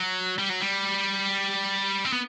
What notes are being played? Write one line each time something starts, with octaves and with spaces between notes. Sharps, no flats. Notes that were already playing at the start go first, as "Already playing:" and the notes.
Already playing: F#3
G3
F#3
G3
C4
B3